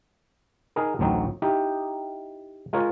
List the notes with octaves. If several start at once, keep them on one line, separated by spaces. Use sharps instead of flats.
D#4 G#4 A#4
A1 D2 F#3 C4 D#4
D#4 E4 G4
G#3 F4 A#4 C#5